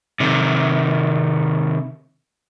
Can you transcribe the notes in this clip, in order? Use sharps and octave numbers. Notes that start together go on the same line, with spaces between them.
C3 D#3